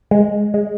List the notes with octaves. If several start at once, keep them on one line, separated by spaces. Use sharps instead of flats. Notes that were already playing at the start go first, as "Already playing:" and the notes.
G#3
G#3